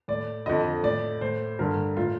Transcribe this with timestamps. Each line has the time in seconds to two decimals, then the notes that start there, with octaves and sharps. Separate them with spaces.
0.08 A2 D5
0.46 F2 D3 D#5
0.83 A2 D5
1.21 A2 C5
1.59 G2 D3 A#4
1.97 A2 F4